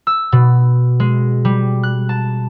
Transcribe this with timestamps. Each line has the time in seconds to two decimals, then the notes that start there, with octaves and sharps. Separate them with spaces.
0.07 E6
0.32 B2
1.00 G#3
1.45 G3
1.83 F#6
2.09 A5